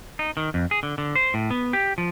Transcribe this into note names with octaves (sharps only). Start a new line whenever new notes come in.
D#4
D#3
F2
G#4
D3
D3
C5
A2
B3
G4
F3